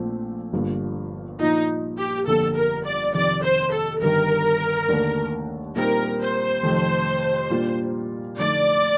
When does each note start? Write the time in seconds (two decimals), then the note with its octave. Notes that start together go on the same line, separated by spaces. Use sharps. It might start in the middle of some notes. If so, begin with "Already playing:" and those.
Already playing: A#1 A#2 A3 C4 F4
0.53 G1 G2 F3 A#3 F4
1.40 A#2 F3 A#3 D4 D#4 F4
1.98 G4
2.27 G1 F2 D3 G3 A#3 A4
2.56 A#4
2.85 D5
3.14 F2 C3 D#3 D5
3.43 C5
3.72 A4
4.01 G1 G2 D#3 A#4
4.88 D#2 D3 A3 D4
5.76 A#2 G3 C4 D#4 A#4
6.20 C5
6.63 F2 C3 D#3 A3
7.50 A#2 G3 A#3 D4 F4
8.37 F2 D3 A3 D#4 D5